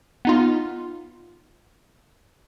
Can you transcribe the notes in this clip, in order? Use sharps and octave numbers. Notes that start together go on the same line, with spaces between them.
B3 D#4 F4